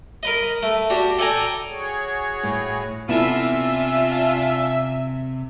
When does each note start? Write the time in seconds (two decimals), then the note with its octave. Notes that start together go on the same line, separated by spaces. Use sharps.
0.23 A#4 B4 D#5
0.63 A3
0.90 D4 F#4 G4
1.19 A4 D5 G5 G#5 A#5
1.67 F#4 G#4 C#5
2.43 A2
3.09 C3 B3 C#4 D4 E4 F4 A4 E5